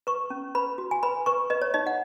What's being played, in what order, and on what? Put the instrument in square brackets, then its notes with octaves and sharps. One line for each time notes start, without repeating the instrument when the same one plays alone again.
[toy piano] B4 C#6
C#4
B4 B5
F#4
G#5
B4 B5
B4 C#6
B4 D#5
C#5
D#4 D#5
F#5